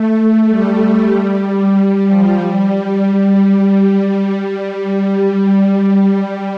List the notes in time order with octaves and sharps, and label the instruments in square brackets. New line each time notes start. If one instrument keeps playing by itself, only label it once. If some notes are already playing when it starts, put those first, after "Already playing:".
Already playing: [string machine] A3
A3
G3
G3
F3
G3